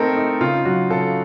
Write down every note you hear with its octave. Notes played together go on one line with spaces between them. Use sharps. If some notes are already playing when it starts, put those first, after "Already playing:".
Already playing: A3 C4 D#4 A4 A#4
D#4
C#3 F4
F#3 F#4
C#3 A4